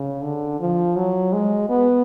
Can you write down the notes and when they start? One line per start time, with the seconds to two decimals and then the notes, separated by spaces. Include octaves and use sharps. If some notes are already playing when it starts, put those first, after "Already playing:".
Already playing: C#3
0.22 D3
0.60 F3
0.96 F#3
1.33 G#3
1.69 B3